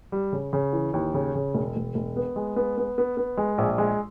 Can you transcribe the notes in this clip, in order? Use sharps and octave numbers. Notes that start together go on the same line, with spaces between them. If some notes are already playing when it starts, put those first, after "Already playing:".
G3
C#3
C#3
E3
D#2
C#3
C#3
E1
E1
E1
B3
G#3
B3
B3
B3
B3
G#3
A#1
G#3